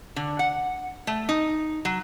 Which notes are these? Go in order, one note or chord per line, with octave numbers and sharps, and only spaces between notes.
D3
F#5
A3
D#4
F#3